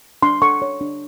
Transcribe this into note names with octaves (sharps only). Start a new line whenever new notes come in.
D4 C6
A4 C#6
C#5
D4